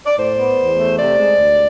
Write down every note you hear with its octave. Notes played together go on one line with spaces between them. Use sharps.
D5
A2 C5
B3
E2
A3
C3 D5
G#3
D2